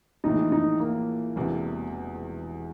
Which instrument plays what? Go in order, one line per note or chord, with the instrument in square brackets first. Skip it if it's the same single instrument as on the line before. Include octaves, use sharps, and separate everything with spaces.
[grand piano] A#1 A2 E3 G#3 [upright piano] D#4
[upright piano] D#4
A#3
[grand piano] E1 E2 C3